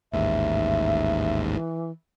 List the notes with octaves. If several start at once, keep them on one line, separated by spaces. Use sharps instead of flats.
A1 D#2 G#2 E5
E3